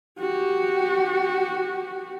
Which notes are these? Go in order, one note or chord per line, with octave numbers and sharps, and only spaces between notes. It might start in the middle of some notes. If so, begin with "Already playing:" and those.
F#4 G4